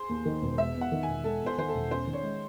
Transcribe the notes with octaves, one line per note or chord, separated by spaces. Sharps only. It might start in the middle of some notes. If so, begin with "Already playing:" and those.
Already playing: G#4 C5
D#2
D#3
E1
G#3 E5
E2
F#5
D#3
E1 G#5
G#3 A4
E2 C5
D#3 C5
A4
E1
C#4 C5
D#3
C#5
G#3